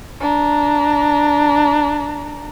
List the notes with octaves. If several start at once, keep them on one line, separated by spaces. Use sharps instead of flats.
D4 A#5